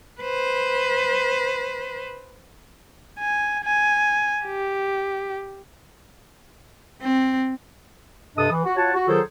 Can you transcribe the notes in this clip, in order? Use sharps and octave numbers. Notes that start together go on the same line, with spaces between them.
B4 C5
G#5
G#5
G4
C4
G2 C3 D4 A4 D#5 D#6
E3
F#4
F4 F#4 C#5 F#5 A5
F#4
D#3 F#3 F4 G#4 A4 C5